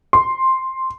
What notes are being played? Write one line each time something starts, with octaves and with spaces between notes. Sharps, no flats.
C6